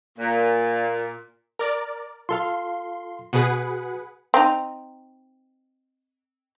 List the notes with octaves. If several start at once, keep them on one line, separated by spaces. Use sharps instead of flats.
A#2
A#4 D5
F4 A4 F5 C6
B2 F#4 G#4 B4 F#5
C4 D#4